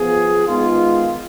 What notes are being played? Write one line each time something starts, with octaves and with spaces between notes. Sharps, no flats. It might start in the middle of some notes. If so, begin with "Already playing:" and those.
Already playing: F3 B3 F4 G#4
D#3 G#3 B3 F4